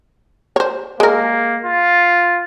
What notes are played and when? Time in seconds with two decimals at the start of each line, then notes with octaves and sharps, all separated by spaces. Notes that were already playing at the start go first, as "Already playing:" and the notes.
0.56 C5 C#5
1.00 G#3 A#3 A#4
1.65 F4